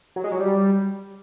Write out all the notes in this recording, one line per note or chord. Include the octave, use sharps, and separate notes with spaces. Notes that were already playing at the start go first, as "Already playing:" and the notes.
F#3
G#3
F#3
G3